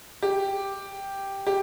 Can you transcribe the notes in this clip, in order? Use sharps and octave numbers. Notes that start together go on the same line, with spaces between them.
G4
G4